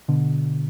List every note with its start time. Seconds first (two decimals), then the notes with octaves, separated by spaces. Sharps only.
0.08 B2 D3